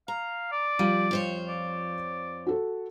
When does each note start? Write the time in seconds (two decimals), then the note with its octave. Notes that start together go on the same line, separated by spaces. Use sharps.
0.08 F5 A#5
0.52 D5
0.79 F3 G3 F5 D#7
1.11 F2 C5 C#5
1.49 D5
2.47 F#4 A4